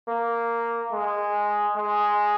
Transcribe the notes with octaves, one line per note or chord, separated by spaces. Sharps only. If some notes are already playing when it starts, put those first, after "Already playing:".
A#3
G#3
G#3